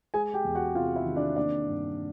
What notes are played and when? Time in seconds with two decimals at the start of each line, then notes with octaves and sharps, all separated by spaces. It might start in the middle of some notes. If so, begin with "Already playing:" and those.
0.14 G#3 G#4 G#5
0.34 G4 G5
0.45 E2
0.55 F#4 F#5
0.75 C3 F4 F5
0.95 E4 E5
1.05 D#3
1.16 D4 D5
1.36 A#3 D4 D5
1.67 G2